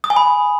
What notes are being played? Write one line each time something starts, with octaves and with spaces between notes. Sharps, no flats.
D#6
G#5
B5